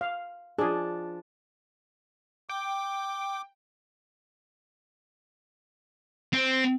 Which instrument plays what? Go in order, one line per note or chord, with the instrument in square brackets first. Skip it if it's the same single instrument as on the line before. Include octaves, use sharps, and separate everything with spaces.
[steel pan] F5
[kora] F3 D4 [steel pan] G#4
[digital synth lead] G5 [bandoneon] D6
[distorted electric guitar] C4